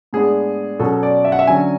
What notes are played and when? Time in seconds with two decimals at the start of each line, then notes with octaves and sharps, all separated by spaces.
0.13 A2 G#3 B3 D4 G#4
0.80 B2 F#3 C#4 A4
1.03 D5
1.25 E5
1.32 F#5
1.39 E5
1.47 D3 F#3 C#4 G#5